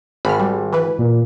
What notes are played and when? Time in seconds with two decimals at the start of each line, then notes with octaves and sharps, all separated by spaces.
0.25 G#1 B5 F6
0.39 G3
0.73 E3 B4
0.98 A#2